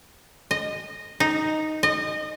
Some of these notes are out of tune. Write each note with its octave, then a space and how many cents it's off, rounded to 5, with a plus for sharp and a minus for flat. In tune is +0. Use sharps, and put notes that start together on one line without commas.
D#5 -10
D#4 +0
D#5 -25